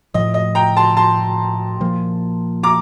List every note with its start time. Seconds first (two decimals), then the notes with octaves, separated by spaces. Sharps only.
0.14 A2 F3 A3 D#5
0.34 D#5
0.55 G5 A#5
0.77 A5 C6
0.97 A5 C6
1.80 A#2 F3 A#3
2.63 A#5 D6